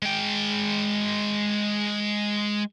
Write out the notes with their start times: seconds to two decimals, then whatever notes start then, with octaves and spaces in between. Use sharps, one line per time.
0.02 G#3 G5